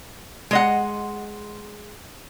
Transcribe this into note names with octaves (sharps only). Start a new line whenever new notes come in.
G#3 D#5 F#5